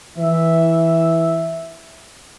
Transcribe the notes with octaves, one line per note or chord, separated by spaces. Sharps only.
E3 E5